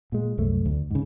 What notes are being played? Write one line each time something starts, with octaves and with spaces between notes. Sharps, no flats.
A#2 G#3
C2 F#2 A3
D2
G#2 C#3